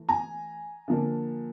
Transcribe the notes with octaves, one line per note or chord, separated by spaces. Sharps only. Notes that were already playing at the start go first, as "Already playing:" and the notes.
Already playing: E3 A3
G#5 A#5
D3 F3 A#3 D4